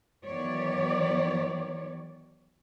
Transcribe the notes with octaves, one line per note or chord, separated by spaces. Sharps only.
D#3 E3 F#3 B3 C#5 D5